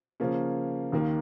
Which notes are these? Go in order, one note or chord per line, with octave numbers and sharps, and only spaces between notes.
C#3 F3 A#3 C#4
D#2 D#3 A#3